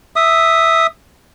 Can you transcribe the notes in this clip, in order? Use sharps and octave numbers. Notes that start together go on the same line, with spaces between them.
E5 D#6